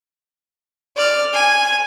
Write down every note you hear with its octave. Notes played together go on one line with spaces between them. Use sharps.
D5 F6
G#5